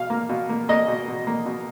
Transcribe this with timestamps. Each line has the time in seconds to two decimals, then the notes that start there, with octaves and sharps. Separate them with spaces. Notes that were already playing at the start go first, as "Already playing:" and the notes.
Already playing: B2 F5
0.10 A#3
0.29 B2
0.49 A#3
0.69 A#3 D#5
0.88 B2
1.08 B2
1.27 A#3
1.46 B2